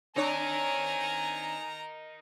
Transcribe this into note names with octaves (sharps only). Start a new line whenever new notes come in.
C4 D4 D#4 A#4 C#5 G#5 A#5